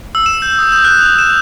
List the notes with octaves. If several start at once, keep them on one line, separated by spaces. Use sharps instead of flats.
E6
E7
G6
D#6
G6
F#6
F7
E7